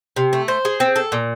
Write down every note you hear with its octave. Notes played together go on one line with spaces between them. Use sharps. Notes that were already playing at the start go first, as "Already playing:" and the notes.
C3
A3
C5
G#4
C4
A4
A#2